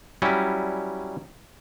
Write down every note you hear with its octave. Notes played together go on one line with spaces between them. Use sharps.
F#3 G3 C#4 E4